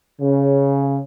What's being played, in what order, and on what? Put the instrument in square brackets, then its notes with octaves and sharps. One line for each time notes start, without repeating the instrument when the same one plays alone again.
[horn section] C#3